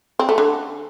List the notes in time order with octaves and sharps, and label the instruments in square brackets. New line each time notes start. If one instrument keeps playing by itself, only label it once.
[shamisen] C4
A3
D3